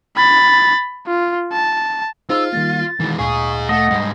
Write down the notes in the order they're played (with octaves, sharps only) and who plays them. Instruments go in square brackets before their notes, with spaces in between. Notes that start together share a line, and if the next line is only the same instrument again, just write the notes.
[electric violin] B5 A6
F4
A5
[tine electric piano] D#4 G#4 C5 [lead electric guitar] F4 [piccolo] E6
[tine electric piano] D#3 G3 A#3 [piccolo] A6
[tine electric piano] D#3 [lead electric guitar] E3 G#3
[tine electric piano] D2 A#2 F5 [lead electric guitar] D#4 G#4 [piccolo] C#6
[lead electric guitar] A3 [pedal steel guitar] D#5 [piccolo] F#5
[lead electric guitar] G#2 G3